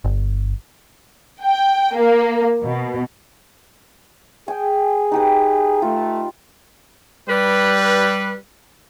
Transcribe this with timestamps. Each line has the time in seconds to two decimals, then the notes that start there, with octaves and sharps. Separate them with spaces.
0.04 G1
1.43 G5
1.97 A#3
2.64 B2
4.48 G#4 G5 G#5
5.12 D#4 G4 B4
5.82 A3 F4
7.29 G3 B4